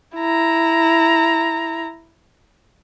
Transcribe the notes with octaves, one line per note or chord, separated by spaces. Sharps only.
E4 A#5